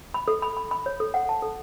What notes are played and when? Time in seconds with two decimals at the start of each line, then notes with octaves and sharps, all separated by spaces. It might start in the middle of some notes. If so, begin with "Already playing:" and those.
0.14 B5
0.28 A4
0.42 B5
0.57 B5
0.71 B5
0.86 C#5
1.00 A4
1.14 F#5
1.29 A5
1.42 A4